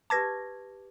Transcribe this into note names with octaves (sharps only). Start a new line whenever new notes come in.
G4 B4 A5 D6 G#6 A#6